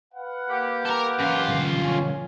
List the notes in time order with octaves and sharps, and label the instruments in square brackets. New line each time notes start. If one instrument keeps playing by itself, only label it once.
[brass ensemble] B4 F5 F#5
[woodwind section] A#3 G4
[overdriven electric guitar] A4 A#4
F#2 F4
[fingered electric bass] D3 F3 G3
[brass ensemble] C#4